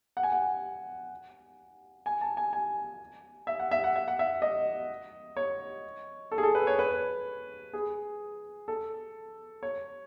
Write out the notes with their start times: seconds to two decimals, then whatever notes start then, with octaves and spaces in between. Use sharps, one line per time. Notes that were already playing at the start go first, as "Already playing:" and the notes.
0.17 F#5
0.23 G#5
0.32 F#5
2.06 G#5
2.21 A5
2.37 G#5
2.53 G#5
3.47 E5
3.59 F#5
3.71 E5
3.84 F#5
3.96 E5
4.08 F#5
4.19 E5
4.42 D#5
5.37 C#5
6.32 A4
6.38 G#4
6.43 A4
6.55 B4
6.67 C#5
6.79 B4
7.73 G#4
8.68 A4
9.63 C#5